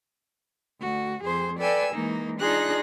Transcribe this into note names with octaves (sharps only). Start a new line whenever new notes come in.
D2 F#4
F2 G#4 C5
A4 B4 D5 G5 G#5 E6
E3 G#3 A#3 D#4
D4 D#4 F4 G#4 F#6 A#6